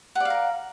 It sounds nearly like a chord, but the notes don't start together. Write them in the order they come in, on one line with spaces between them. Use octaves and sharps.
F#5 D5 F5 A#4